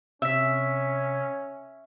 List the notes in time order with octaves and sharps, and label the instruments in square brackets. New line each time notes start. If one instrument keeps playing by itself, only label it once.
[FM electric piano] C3 [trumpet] C#4 [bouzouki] E5 [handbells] E6 B6